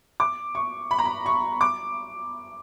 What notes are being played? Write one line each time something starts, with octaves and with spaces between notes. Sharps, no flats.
D6
C#6
B5
A#5
B5
C#6
D6